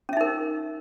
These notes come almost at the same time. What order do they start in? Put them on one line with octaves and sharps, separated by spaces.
C#4 E5 D#4 A#4